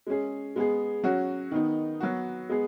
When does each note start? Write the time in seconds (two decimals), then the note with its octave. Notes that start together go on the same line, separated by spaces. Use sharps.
0.07 G#3 C#4 G#4
0.56 G#3 B3 G#4
1.04 F#3 C#4 F#4
1.52 D#3 B3 D#4
2.00 F#3 B3 F#4
2.49 G#3 B3 G#4